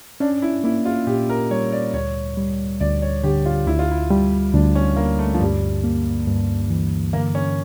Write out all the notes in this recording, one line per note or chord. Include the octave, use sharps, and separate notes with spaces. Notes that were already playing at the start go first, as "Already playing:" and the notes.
C#4 D4
E4
A#3 E4
F4
A#2 G4
A#4
G3 C#5
D5
D2 C#5
G3
D2 D5
C#5
D3 G4
F4
D2 E4
F4
E4
G3
D2 D4
C#4
D3 A#3
A3
F3
G2 G3
A#3
G2
E3
D3 A#3
C#4